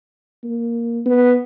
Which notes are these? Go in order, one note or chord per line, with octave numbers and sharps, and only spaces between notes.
A#3
B3